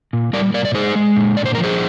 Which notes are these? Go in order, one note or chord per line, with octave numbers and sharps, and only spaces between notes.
A#2
G3 A#4 D5
A#2 A#4 D5
D5
G#3 G#4 C5
G#3
A#2
D3 D5
C5
F3 A#4
G#4 C5